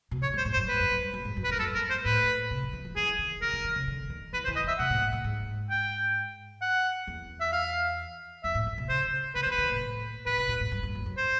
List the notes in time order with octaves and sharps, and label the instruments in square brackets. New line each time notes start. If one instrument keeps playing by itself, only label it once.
[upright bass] B2
[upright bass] A#2 [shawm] C#5
[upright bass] G#2
[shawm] C5
[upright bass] G#2
[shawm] C5
[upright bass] F#2
[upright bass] G2 [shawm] B4
[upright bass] F#2
F#2
G2
F#2
G#2
F#2
[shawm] B4
[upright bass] F2
[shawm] A#4
[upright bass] F#2 [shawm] A4
[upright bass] F#2 [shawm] A#4
[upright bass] G#2 [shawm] C5
[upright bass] A2 [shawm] B4
[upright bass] C3
D#3
E3
F3
[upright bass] E3 [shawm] G#4
[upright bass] D#3
[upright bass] D#3 [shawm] A#4
[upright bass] E3
D#3
C#3
D3
D#3
[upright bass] E3 [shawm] B4
[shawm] C5
[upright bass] E3
[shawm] D#5
[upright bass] E3 [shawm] E5
[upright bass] B2 [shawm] F#5
[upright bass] A2
A2
A2
G#2
[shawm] G5
F#5
[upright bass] E2
[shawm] E5
F5
[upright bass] F2 [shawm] E5
[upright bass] A2
A#2
B2
[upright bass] C#3 [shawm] C5
[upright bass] D3 [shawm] B4
[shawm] C5
[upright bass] D#3
[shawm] B4
[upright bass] D#3
A2
A2
[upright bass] A#2 [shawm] B4
[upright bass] B2
A#2
G#2
G2
G2
F#2
F#2
[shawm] C5